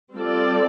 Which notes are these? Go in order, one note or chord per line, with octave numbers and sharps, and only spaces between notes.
G3 C4 F4 A4 D5